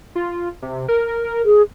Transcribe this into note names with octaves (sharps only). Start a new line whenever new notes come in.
F4
C3
A#4
G#4